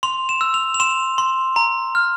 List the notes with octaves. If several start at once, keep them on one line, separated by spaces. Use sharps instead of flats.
C6 F7
E7
E6
F7
F7
C6 E7
C6
A#5
F6